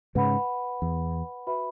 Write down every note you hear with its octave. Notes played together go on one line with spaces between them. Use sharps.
G#2 C#3 B4 F#5 B5
E2
F#4 B4 E5 B5